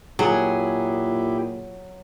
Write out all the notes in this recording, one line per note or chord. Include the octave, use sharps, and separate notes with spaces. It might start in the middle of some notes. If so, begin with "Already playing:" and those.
A#2 F#3 E4 G4 G#4